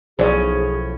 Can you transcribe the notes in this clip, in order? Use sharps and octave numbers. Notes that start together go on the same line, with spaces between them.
B1 A2 F3 C#4 G#4 C5 D5